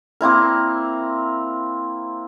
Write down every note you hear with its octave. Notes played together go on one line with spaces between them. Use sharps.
A#3 C4 E4 A#4